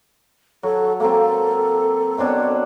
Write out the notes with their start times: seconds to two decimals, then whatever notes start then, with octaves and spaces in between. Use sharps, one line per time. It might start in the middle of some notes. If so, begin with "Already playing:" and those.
0.63 F#3 A4
1.00 A#3 C4 A4
2.18 B2 C4 D4 C#5